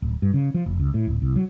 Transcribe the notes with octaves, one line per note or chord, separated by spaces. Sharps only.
D1
G2
C#3
F3
F1
C#2
A2
D1
C2
F#3